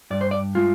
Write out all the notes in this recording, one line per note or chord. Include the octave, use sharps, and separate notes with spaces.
G2 D5
C5
D5
G#3 F4